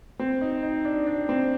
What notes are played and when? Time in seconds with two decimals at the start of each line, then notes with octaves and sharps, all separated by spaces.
0.19 C4
0.41 D#4
0.63 D#4
0.85 D4
1.07 D4
1.29 C4